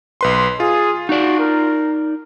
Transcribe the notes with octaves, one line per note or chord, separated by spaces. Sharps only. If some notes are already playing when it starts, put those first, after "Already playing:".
B1 B4 C6
F4 G#4
D#4 F#4 D5
A#4